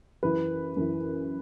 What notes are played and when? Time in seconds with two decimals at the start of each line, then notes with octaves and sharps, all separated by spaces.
0.23 F#2 E3 B4
0.77 F#2 E3